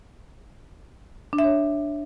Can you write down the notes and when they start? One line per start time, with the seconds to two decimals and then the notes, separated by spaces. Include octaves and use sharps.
1.33 D4
1.39 E5
1.44 C#5